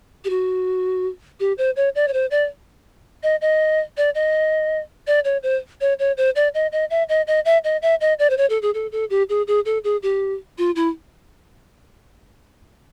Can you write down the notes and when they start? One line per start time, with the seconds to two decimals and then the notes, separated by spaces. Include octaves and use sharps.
0.25 G4
0.30 F#4
1.40 G4
1.58 C5
1.76 C#5
1.95 D5
2.08 C#5
2.13 C5
2.31 D5
3.23 D#5
3.41 D#5
3.97 D5
4.15 D#5
5.07 D5
5.25 C#5
5.43 C5
5.81 C#5
5.99 C#5
6.17 C5
6.36 D5
6.54 D#5
6.72 D#5
6.90 E5
7.09 D#5
7.27 D#5
7.45 E5
7.64 D#5
7.82 E5
8.01 D#5
8.19 D5
8.30 C5
8.37 C#5
8.50 A4
8.62 G#4
8.74 A4
8.92 A4
9.10 G4
9.29 G#4
9.47 G#4
9.65 A4
9.84 G#4
10.03 G4
10.58 F4
10.76 E4